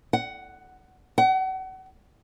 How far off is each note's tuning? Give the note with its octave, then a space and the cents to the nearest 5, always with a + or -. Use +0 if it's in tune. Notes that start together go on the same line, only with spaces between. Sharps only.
F#5 +10
F#5 +35